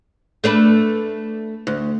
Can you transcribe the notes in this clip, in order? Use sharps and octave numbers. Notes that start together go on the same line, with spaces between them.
A3 D4 B4
D2